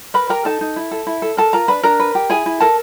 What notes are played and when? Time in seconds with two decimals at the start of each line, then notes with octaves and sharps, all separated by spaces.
0.14 A#4 B4 B5
0.30 G4 A#4 A#5
0.45 D#4 A4 A5
0.61 D#4
0.76 E4
0.91 A4
1.07 E4
1.22 A4
1.37 A4 A#4 A5
1.53 F4 A#4 A#5
1.68 D4 B4 B5
1.83 D4 A#4 A#5
1.99 B4
2.15 G4
2.30 E4 G#4 G#5
2.46 E4
2.60 A4 A#4 A5